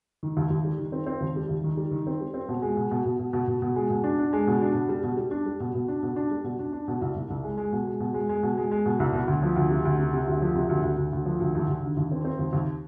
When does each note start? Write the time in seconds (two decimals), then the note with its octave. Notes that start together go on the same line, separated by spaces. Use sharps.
0.23 D#3
0.37 D#2
0.50 D#2
0.64 G3
0.79 D#3
0.92 C4
1.06 C4
1.21 D#2
1.36 G3
1.49 D#2
1.64 D#3
1.77 G3
1.91 D#3
2.07 C4
2.21 G3
2.34 C4
2.49 B2
2.62 G#3
2.76 B2
2.91 B2
3.05 B2
3.19 B2
3.33 B2
3.47 B2
3.62 B2
3.76 G#3
3.90 B2
4.04 D4
4.19 D4
4.33 G#3
4.47 B2
4.61 D4
4.74 B2
4.89 G3
5.03 B2
5.17 G3
5.31 D4
5.46 G3
5.60 B2
5.74 B2
5.88 D4
6.03 B2
6.16 D4
6.31 G3
6.44 B2
6.59 D4
6.73 D4
6.88 B2
7.02 C2
7.16 C2
7.30 C2
7.43 G#3
7.58 G#3
7.72 B2
7.87 G#3
8.00 B2
8.14 G#3
8.29 G#3
8.43 B2
8.57 G#3
8.71 G#3
8.86 B2
9.00 C2
9.13 B2
9.28 D2
9.43 F3
9.56 D2
9.70 C3
9.85 D2
9.99 C3
10.13 C3
10.28 D2
10.41 F3
10.55 C3
10.69 D2
10.83 D2
10.97 D2
11.13 D2
11.26 F3
11.40 D2
11.55 D#2
11.68 D#2
11.83 D3
11.97 D#2
12.12 C4
12.25 C4
12.39 D#2
12.53 D#2